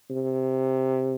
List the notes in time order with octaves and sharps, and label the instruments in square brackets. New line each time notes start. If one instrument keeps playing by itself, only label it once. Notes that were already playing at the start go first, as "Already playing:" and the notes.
[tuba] C3